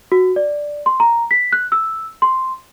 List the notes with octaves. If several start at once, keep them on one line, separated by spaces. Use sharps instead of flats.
F#4
D5
C6
A#5
B6
F#6
E6
C6